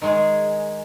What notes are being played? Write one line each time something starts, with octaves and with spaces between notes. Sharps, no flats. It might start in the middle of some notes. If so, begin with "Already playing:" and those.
D#3 G#3 G#4